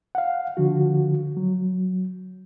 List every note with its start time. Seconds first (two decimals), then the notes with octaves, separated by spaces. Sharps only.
0.15 F5 F#5
0.57 D3 F3 F#4
1.37 F#3